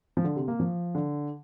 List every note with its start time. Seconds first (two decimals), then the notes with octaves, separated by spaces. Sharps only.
0.17 F3
0.24 D3
0.36 C3
0.48 A#3
0.60 F3
0.95 D3